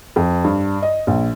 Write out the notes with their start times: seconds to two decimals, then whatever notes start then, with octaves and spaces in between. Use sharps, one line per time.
0.16 F2
0.44 G2
0.83 D#5
1.07 A#1